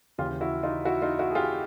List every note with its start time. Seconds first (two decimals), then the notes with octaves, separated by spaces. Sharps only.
0.18 D#2 C#3 E3 F4 G4
0.41 E4 F#4
0.63 D#4 F4
0.85 E4 F#4
1.02 D#4 F4
1.19 E4 F#4
1.30 G#4
1.35 F4 G4